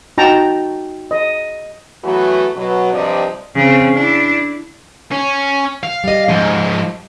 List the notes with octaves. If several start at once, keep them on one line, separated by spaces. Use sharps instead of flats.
D#4 F#4 G5 A5 A#5
D#5
E3 F#3 A3 B3 F#4
B2 F#3
G2 C3 F3 G3 D5 D#5
C#3 C4
D4 E4
C#4
F5
G3 D#5
G#2 F3 D#5